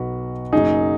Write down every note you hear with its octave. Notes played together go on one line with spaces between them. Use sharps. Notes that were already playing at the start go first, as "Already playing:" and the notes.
Already playing: B1 B2 F#3 F#4 B4
F#1 F#2 F#3 D#4 G#4